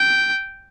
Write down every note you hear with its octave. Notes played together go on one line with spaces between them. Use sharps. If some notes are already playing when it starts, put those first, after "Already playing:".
Already playing: G5